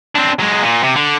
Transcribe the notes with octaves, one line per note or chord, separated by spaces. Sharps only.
C4 D4
F#3 G#3
A#2
C3
D3